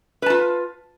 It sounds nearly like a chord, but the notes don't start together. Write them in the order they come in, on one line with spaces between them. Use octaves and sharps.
B4 A5 F4